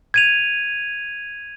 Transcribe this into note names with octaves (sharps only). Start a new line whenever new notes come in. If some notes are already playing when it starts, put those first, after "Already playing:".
G#6 D#7 F7